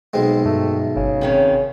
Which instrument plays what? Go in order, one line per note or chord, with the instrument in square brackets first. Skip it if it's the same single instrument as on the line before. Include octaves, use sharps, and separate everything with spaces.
[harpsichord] B1 G#3 [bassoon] C4
[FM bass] G2 [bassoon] A3
[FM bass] G1 [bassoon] C#3
[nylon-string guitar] C3 D#3 C#4